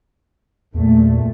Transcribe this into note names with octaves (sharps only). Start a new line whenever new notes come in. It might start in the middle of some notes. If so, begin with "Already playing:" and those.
E2 A#2 A3